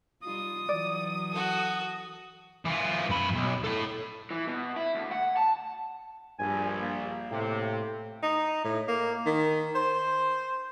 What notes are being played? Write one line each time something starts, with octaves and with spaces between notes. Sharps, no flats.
G3 D#4 F4 D#6
E3 F#3 D5
F#4 A4
E3 F4
F#2 B5
B1
E4 A4
E3
B2
E4
D2
F#5
A5
A#1 G2 G#5
A#3
A2 C3
D#4
A2
A#3
D#3
C5